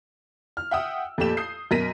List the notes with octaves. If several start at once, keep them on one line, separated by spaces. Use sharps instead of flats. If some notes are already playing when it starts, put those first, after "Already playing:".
F6
E5 F#5 G5 D#6 E6
F2 A#2 A3 G4 E7
D#6 G6 C7
F#2 B2 A#4 A#6 B6 D#7